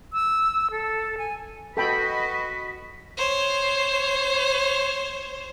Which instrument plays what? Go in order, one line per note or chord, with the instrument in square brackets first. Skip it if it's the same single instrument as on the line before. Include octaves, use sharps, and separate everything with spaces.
[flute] E6
A4
G#5
[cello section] F#4 B4 D#5 [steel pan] A4 G5 B5 [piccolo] B6
[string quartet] C5 C#5